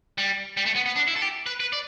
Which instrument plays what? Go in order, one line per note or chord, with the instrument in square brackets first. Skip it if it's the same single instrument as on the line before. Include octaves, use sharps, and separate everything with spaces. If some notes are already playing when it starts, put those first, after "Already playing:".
[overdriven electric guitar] G3
G3
A3
B3
B3
D4
E4
A4
G4
B4
B4
D5